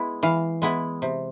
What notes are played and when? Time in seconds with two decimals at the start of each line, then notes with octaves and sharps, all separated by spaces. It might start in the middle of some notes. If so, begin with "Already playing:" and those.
Already playing: G#3 B3 E4
0.23 E3 F5
0.62 G#3 B3 E4
1.02 C3